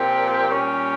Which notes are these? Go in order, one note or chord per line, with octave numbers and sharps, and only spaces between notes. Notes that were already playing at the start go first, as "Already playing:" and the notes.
Already playing: A#2 F3 C4 G4
A#2 G3 C#4 G4